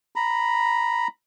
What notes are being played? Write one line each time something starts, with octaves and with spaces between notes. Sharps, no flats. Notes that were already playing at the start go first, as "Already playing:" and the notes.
A#5 B5